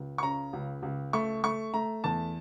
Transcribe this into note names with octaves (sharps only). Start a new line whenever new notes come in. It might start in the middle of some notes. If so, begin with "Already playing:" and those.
Already playing: C#2
C#6
C#3 A#5
C#2
C#2
A3 C#6
A3 C#6
A3 A#5
E2 A5